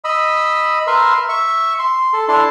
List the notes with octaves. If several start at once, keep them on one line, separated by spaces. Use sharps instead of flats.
D#5 B5 E6
A#4 B4 E5 C6
E5 C#6
C6
A4
D4 E4 A4 A5 C6